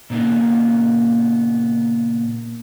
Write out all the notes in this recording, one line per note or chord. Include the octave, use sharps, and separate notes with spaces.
A#2 C#3 A#3 B3 D#4